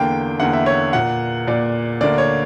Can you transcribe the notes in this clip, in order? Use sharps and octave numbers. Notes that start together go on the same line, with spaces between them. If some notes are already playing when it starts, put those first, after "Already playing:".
Already playing: E2 D3 A#3 G5
E2 D3 A#3 F#5
E5
C#5
A#2 A#3 F#5
A#2 A#3 D5
D2 D3 A#3 D5
C#5